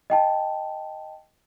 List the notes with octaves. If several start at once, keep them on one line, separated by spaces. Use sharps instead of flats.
D#5 G5 A5